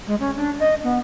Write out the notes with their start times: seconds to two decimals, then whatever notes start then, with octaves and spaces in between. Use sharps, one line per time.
0.08 G#3
0.20 C#4
0.37 D4
0.60 D#5
0.83 B3